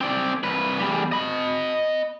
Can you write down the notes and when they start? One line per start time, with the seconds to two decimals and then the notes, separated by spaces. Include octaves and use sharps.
0.01 C4 D5
0.44 C2 B4
0.79 E2 G3
1.12 D#5 B5